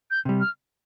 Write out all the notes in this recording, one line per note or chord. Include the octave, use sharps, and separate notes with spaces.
G6
C3 G3
F6